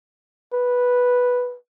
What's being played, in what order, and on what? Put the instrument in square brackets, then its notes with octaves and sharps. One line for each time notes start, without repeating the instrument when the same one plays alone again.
[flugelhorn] B4